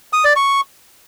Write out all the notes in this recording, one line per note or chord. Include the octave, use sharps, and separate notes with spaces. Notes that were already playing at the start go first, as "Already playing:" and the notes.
D#6
D5
C#6